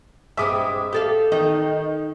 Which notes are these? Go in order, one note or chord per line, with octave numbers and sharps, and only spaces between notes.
G2 G#3 C4 E5 D6 D#6
G4 A4 F5
D#3 D#4